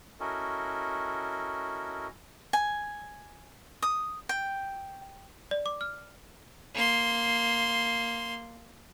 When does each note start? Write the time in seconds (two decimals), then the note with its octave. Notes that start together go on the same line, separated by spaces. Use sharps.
0.20 C#4 E4 F#4 A4 A#4 D#5
2.53 G#5
3.82 D#6
4.29 G5
5.51 D5
5.66 D6
5.81 F6
6.75 A#3 C6